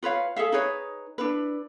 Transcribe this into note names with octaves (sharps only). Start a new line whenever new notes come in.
F4 B4 C#5 F5
G#4 A4 E5 F5
D#4 G#4 B4 C#5
D4 E4 B4